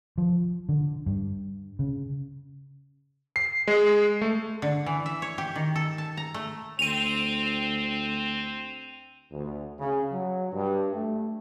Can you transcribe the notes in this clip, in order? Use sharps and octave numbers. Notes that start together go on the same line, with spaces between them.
F3
D3
G2
C#3
C7
G#3
A3
D3
E3
E5
C#5
G4
D#3
A4
A5
A#5
A3
D2 C4 D#7 F7
D2
C#3
F#3
G2
A3